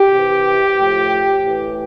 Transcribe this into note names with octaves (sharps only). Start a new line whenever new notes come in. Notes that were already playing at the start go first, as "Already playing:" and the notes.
Already playing: G4
C3 E3
A2 F3
A2 E3